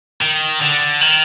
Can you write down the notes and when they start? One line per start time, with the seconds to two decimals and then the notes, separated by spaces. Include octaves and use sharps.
0.21 D#3
0.61 D3
1.01 D#3